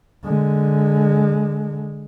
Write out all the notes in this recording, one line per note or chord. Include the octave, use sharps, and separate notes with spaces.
D3 G#3